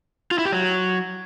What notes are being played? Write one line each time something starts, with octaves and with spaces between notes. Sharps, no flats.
F4
E4
G4
F#3